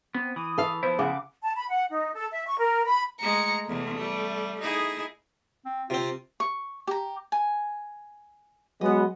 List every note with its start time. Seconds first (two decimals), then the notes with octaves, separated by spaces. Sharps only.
0.14 B3 C4
0.36 E3 D#6
0.58 A4 B4 F5
0.83 F3 B3 E4 C5
0.99 C#3 F#5 D6
1.42 A5
1.57 B5
1.69 F#5
1.91 D#4
2.14 A4
2.32 E5
2.48 C#6
2.59 A#4
2.87 B5
3.20 G#3 A3 A#5 C#7
3.68 E2 C3 A3
3.97 G3
4.61 D#4 E4 G#4
5.65 C4
5.90 C3 C4 F4
6.40 C#6
6.87 G4 A#5
7.32 G#5
8.81 F#3 G#3 B3 D#5 F#5